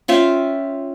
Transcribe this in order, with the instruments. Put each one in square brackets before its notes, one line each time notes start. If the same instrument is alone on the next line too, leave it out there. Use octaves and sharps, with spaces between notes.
[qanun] C#4 F4 E5 G5